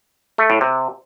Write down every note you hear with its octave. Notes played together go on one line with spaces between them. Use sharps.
A3
A2
C3